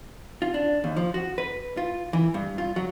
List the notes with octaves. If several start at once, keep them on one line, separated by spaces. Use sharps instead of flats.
F4
D4
D#2
F3
F#4
B4
F4
E3
G2
F4
F#3